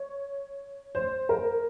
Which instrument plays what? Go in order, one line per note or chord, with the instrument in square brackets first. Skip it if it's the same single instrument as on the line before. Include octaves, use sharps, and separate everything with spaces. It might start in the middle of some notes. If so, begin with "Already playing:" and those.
Already playing: [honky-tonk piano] C#5
C5
A#4